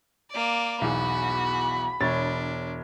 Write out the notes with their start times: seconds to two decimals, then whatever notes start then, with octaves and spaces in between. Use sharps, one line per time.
0.30 A#3 D5
0.81 B1 E2 F#4 B5
2.01 E1 D4 C#5 A6